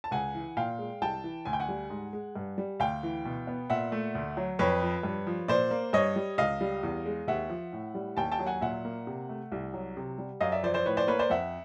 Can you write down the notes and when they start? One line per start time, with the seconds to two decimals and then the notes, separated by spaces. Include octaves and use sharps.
0.04 A5
0.11 C#2 F#5 G#5
0.35 E3
0.57 A#2 F5 G5
0.79 G#3
1.01 C2 G5 A5
1.24 E3
1.45 D2 G#5
1.53 G5
1.60 F#5 G#5
1.69 G3
1.90 G#2
2.13 G#3
2.35 G2
2.58 G3
2.80 D2 F5 G5
3.03 E3
3.25 B2
3.47 B3
3.70 A#2 E5 F#5
3.92 A3
4.15 D2
4.37 F#3
4.59 F2 B4 C#5
4.82 F3
5.03 G2
5.27 F3
5.48 A#2 C5 D5
5.71 A#3
5.93 G2 C#5 D#5
6.16 G3
6.38 C#2 D#5 F5
6.61 G3
6.83 E2
7.06 G#3
7.28 D#2 E5 F#5
7.49 F3
7.73 A2
7.95 G3
8.17 D#2 G5 A5
8.32 G5 A5
8.39 F#3
8.46 F#5 G#5
8.61 A#2 E5 F#5
8.85 A#3
9.07 C3
9.29 A3
9.52 C2
9.74 F#3
9.97 C3
10.18 G3
10.41 F#2 D#5 F5
10.52 D5 E5
10.63 F3 C5 D5
10.74 C5 D5
10.86 A2 B4 C#5
10.97 C5 D5
11.07 A#3 B4 C#5
11.19 C5 D5
11.30 F2 E5 F#5